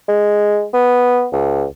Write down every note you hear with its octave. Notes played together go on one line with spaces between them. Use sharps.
G#3
B3
C#2